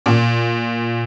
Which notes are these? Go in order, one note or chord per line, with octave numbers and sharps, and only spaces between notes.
A#2